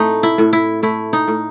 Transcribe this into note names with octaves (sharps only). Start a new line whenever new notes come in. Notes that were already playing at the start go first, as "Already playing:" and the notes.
Already playing: A2 A3 C4 D#4
E4
A2
E4
A3 E4
D#4
A2